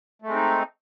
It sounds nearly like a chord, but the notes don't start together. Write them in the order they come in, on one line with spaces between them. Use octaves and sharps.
A3 G#3 C4 D#4